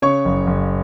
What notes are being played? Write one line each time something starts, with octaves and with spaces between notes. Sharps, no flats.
C#3 C#5 C#6
F#1
F#1